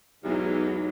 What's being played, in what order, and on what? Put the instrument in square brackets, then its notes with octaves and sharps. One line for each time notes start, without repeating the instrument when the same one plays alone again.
[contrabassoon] B1 [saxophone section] E2 [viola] F#3 G#3 [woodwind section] D#4 G4